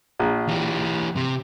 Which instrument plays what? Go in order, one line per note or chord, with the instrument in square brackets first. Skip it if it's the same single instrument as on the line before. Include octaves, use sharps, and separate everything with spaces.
[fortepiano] A#1
[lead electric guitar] E3 G4
C3